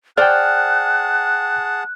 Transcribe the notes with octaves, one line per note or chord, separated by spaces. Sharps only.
G#4 C5 D5 F#5 G5 A5 F6 F#6